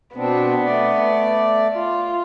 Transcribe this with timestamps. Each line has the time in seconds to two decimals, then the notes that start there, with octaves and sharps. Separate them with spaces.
0.16 B2 B3 C4 D4
0.64 A3 D5
1.75 F4